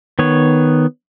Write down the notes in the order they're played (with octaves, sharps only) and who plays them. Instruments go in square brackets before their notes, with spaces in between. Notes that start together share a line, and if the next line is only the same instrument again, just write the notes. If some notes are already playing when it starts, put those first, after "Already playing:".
[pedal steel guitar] D#3 B3 C#5